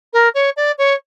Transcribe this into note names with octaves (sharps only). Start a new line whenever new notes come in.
A#4
C#5
D5
C#5